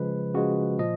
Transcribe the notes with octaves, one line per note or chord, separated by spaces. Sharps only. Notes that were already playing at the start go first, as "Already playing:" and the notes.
Already playing: C#3 F3 G#3 B4
C#3 F3 G#3 F#4
A#2 F3 D#5